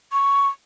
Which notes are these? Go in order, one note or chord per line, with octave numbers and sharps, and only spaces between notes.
C#6